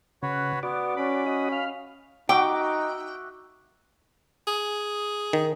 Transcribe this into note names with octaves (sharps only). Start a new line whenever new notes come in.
C#3 F#4 B4 C#5
B3 F#4 D5
C#4 B5
F#4 D#5
F5
D#4 F#4 E5 G5 D6
G#4
D#3